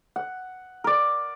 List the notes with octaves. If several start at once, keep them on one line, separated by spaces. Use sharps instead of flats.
F#5
A#4 D5